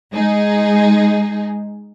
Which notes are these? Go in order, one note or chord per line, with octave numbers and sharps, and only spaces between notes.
G#3 D#4 G#4